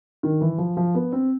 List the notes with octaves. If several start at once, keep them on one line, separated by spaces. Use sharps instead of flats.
D#3
E3
F3
F3
B3
C4